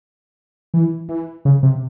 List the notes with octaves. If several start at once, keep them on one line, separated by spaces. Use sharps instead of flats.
E3
E3
C#3
C3